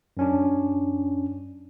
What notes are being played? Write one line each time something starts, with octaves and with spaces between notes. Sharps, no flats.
F#2 C#4 D4